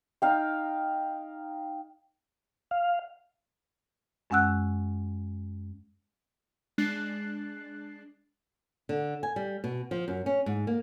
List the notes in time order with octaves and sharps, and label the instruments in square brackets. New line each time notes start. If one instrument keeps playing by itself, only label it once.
[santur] D#4 F5 G5
[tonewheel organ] F5
[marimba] F#2 G#3 C#4 F#5 E6 F#6
[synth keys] G#3 D4 F#6 A6 C7
[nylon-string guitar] D3
G#5
G3
B2
F3
F#2
C#4
G#2
A#3